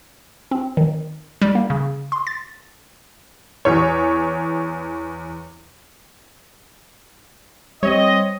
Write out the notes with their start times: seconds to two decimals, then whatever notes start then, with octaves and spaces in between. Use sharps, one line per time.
0.51 C4
0.77 D#3
1.42 G3
1.55 A#3
1.70 C#3
2.12 C6
2.27 A6
3.65 E2 C#5
7.83 G3 C4 C#5 D#5